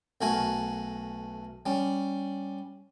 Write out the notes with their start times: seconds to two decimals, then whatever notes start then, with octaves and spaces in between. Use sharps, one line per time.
0.21 B1 A3 F#4 A#4 G#5
1.66 G3 C#4